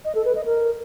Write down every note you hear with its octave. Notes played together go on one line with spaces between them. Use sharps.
D#5
A4
B4
D#5
A#4